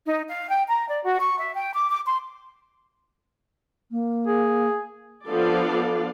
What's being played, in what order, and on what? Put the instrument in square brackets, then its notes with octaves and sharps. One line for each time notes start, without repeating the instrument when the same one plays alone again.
[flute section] D#4
F5
G5
A#5
D5
F#4
C#6
E5
G5
D6
D6
C6
[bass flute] A#3
[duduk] G#4
[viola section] F3 B3 D4 A4 D5 F5